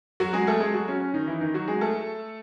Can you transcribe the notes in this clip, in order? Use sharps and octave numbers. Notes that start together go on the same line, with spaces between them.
F#3 F#4
G#3 G#4
A3 A4
G#3 G#4
F#3 F#4
C#4
C#4
D#3 D#4
E3 E4
D#3 D#4
F#3 F#4
G#3 G#4
A3 A4